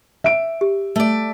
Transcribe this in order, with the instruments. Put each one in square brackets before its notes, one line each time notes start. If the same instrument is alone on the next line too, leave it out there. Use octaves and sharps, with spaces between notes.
[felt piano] E5 D7
[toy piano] G4
[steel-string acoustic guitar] A3 D5